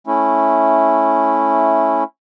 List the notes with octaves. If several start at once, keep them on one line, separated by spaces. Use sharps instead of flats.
A3 C#4 E4